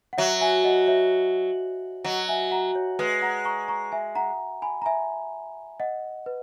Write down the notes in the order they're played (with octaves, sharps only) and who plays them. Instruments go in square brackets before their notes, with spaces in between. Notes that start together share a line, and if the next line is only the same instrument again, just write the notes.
[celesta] F#5
[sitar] F#3 [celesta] C#5 E5
[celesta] E5 G#5
D#5 F#5
C#5 E5
[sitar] F#3 [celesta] D#5 F#5
[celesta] E5 G#5
F#5 A#5
C#5
[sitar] G#3 [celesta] B4
[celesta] F#5 A#5
A#5 C#6
A#5 C#6
E5 G#5
F#5 A#5
G#5 B5
A#5
E5 G#5
D#5 F#5
B4